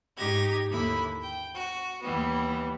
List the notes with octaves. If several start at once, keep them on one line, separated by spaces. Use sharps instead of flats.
G#2 D#4 G4 G#6 A#6
D#2 D3 E4 B5
G5
F#4
D#2 E3 G3 B3